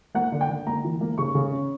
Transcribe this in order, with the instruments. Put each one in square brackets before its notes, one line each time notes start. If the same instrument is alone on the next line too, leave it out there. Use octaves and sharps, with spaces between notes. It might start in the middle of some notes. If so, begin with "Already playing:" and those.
[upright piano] A#3 F#5
D3
G5
D3
A#3 A#5
E3
A#3
C#3 C#6
C#3
C#4